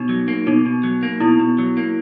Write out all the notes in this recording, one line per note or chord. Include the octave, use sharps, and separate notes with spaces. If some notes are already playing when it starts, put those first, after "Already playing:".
Already playing: B2 D#4
F#3
A#3
B2 D#4
B2
F#3
A#3
B2 E4
B2
F#3
A#3